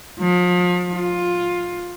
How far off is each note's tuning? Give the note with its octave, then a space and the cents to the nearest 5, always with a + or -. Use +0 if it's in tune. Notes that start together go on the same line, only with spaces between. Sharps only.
F3 +35
F4 +15